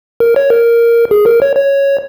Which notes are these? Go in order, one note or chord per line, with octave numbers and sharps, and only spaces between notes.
A#4
C#5
A#4
G#4
A#4
C#5
C#5